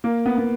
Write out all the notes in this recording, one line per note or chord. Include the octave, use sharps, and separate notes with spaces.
A#3
B3
B3